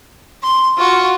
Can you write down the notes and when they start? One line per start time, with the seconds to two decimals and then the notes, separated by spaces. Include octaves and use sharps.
0.43 C6
0.78 F4 F#4